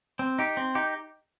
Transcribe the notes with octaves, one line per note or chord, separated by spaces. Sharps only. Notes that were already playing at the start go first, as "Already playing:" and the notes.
C4
D#4 G4
C4
D#4 G4